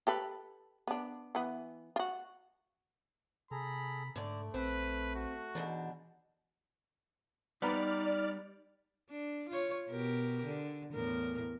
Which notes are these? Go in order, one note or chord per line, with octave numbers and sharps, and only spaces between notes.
G4 A4 B4
B3 D4
E3 B3
F4 F#4
C3 G#4 A4 A#5 B5
G#2 D3 A3 D5
A#1 C4 B4
F#4
G#2 B2 E3 D4
G3 B3 D#4 D5 A#5 F6
D4
F4 C#5
B2 G4 A#4
D3
E2 A2 A#4